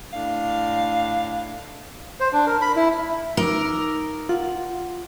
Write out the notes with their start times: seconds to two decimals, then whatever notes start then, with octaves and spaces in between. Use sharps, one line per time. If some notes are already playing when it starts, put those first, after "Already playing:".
0.13 A2 D4 F5
2.20 C5
2.33 D4
2.47 A#4
2.61 B5
2.76 E4
3.37 D#4 A#4 D6 E6
4.29 F4 F#5